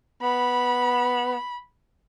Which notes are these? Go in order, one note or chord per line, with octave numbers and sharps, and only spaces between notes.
B3 B5